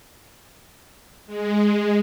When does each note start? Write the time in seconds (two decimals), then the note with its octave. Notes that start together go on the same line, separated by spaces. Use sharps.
1.26 G#3